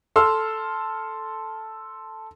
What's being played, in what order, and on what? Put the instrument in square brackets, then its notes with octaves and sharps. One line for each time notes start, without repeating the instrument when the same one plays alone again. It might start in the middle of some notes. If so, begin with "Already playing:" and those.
[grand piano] A4 C6 E6 F6